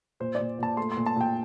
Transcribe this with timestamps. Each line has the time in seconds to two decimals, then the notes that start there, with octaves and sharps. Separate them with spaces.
0.20 A#2 C5
0.35 A#2 D5
0.59 A#2 A5
0.77 A3 C6
0.92 C6
0.97 A#2
1.06 A5
1.16 A#2 G5